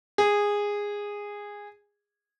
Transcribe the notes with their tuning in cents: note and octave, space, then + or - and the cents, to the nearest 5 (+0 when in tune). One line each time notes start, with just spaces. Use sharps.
G#4 -15